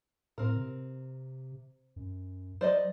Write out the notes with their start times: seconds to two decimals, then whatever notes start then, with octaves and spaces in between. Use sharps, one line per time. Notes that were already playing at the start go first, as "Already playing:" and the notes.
0.38 A2 C4 A#4
0.56 C3
1.96 F#2
2.61 F#3 C5 D5 D#5